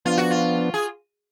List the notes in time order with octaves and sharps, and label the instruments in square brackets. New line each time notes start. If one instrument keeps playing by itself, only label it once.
[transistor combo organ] F3 B3 D4 [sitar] F4
[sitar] F#4
F4
G#4